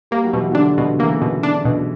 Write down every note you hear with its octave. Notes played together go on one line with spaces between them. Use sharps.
G3 A#3
F#3
B2 E3
D3 F#3 D4
B2
C#3 E3 A#3
B2
D4
B2